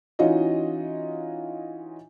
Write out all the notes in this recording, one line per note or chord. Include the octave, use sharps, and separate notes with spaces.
E3 C#4 D#4 F4 F#4 D#5